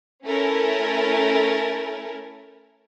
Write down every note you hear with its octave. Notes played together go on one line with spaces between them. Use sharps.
A3 C#4 E4 A4 A#4